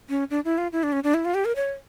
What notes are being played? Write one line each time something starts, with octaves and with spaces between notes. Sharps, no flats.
C#4
D4
E4
F4
E4
D4
C#4
D4
E4
F4
G4
A#4
C#5